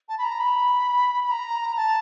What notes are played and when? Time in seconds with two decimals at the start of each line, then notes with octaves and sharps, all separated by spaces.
0.09 A5
0.18 B5
0.24 A#5
0.40 B5
1.24 B5
1.31 A#5
1.77 A5